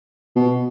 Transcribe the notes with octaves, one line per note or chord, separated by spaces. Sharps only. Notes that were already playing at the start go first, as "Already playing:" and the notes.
B2